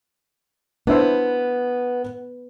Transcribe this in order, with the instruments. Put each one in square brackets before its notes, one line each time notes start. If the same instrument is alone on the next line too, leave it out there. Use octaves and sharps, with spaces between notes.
[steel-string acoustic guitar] B3 [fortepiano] D4 E4 C5